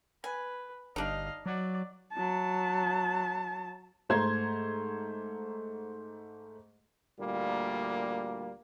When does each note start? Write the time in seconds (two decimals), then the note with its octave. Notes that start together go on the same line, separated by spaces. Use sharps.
0.24 B4 G#5
0.96 G1 D4 D#4 D#5 F5
1.46 F#3 D5
2.13 F#3 A5
4.09 G#2 A3 C5 A#5 C6 G#6
7.20 D2 A#2 G3 A#3